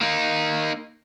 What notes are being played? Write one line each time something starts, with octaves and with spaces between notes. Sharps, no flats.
A#3 D#4